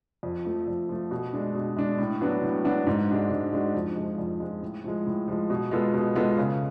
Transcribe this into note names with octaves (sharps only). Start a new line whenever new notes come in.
F2
F3 A3
F2
F3 A3
B2
G#3 D4
B2
G#3 D4
A2
F#3 B3 D4 F#4
A2
F#3 B3 D4 F#4
G#2
G#3 D4 F#4
G#2
G#3 D4 F#4
F2
F3 G#3
F2
F3 G#3
A2
F3 G#3
A2
F3 G#3
B2
G#3 B3 F4 A4
B2
G#3 B3 F4 A4
C#3